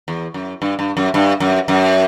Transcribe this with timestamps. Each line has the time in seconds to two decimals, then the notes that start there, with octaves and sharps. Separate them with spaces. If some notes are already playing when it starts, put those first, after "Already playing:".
0.08 E2
0.34 F#2
0.62 G2
0.79 G2
0.97 F#2
1.14 G2
1.40 F#2
1.68 F#2